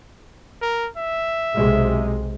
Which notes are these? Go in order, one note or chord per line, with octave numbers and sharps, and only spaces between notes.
A#4
E5
B1 C3 G#3